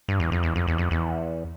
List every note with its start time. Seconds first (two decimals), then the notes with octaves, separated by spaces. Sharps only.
0.09 G2
0.20 E2
0.32 F2
0.43 E2
0.56 F2
0.67 E2
0.78 F2
0.91 E2